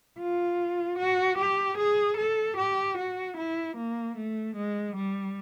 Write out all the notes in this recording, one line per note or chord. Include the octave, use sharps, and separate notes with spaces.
F4
F#4
G4
G#4
A4
G4
F#4
E4
A#3
A3
G#3
G3